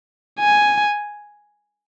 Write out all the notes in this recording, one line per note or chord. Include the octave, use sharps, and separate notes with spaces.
G#5